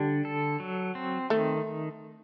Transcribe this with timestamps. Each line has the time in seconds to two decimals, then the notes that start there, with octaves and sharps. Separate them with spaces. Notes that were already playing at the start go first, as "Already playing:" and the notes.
Already playing: D3 G3 D4
0.25 A4
0.60 F#3
0.95 C4
1.30 D#3 A3